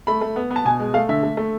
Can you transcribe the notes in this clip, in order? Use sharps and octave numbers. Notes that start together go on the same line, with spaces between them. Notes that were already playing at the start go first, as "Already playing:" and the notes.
A3 B5
A3
B3
B3
A5
B2 G#5
G#3
A3 F5
D3 E5
A3
A3